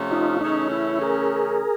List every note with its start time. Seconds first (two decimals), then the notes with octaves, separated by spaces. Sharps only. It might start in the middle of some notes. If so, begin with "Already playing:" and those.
Already playing: C3 F3 A3 C#4
0.11 D#4 F4
0.41 C#3 E3 A3 C#4 D#4
0.72 E4
1.01 G#4 A#4